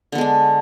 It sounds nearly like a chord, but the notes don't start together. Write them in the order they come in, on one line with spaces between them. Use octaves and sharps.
D3 B3 G#3 D4